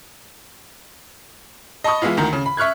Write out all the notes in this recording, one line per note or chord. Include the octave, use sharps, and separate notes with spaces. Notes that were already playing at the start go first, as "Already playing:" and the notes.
D#5 A5 B5 C#6 D#6
E3 G#3 B3 E4 F4
D2 D#3 A#5
C#3
B5
E5 C#6 F6 F#6 G#6